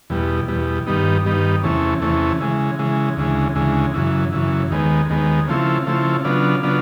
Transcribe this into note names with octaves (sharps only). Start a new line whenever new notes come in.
E2 B2 G3
E2 B2 G3
G2 D#3 G3 B3 D#4
G2 D#3 G3 B3 D#4
E2 C3 E3 A3 C#4
E2 C3 E3 A3 C#4
C#3 E3 G#3
C#3 E3 G#3
D2 C#3 E3 G#3
D2 C#3 E3 G#3
F#2 C#3 E3
F#2 C#3 E3
D#2 D#3 G#3 B3
D#2 D#3 G#3 B3
C#3 F3 A3 C4 E4
C#3 F3 A3 C4 E4
C#3 F#3 B3 D4 F4
C#3 F#3 B3 D4 F4